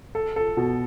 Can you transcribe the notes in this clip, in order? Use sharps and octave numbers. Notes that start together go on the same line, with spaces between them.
A4
A4
B2